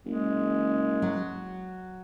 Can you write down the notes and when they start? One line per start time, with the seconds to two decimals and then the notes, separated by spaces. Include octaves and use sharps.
0.06 F#1 G#3
1.02 F#3